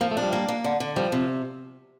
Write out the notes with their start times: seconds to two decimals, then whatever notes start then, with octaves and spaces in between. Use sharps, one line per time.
0.01 F3 A#3
0.11 A3
0.17 D4
0.22 G3
0.32 A#3
0.48 A#3
0.64 D3
0.80 D3
0.96 F3 G3
1.12 C3